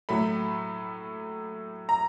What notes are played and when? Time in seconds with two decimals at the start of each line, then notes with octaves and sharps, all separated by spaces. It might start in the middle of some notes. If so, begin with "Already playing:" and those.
0.09 A2 F#3 A3 B5
1.89 A#5